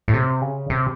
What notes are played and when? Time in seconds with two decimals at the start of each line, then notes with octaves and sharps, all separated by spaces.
0.08 A2
0.14 C3
0.41 C#3
0.70 C3